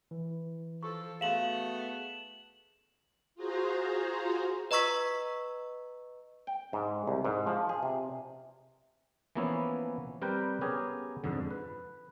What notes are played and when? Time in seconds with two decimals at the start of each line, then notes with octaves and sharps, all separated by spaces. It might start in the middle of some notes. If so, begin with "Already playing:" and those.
0.11 E3
0.83 F3 A4 C#6
1.21 A3 B3 F#4 G#4 F5 C6 E7 F#7
3.35 F4 F#4 G#4 C5 A#5
4.71 B4 D#5 A#5 C#6 E6 B6
6.47 G5
6.73 G#2
7.07 C2
7.25 G#2
7.47 F3
7.69 G#4
7.83 C3
9.35 E3 F3 A#3 B3 C#4 E4
10.22 G3 C4 A#4 B4 G5
10.61 B3 C#4 G4 G#4 A#4
11.24 F2 G#2 D3
11.50 B4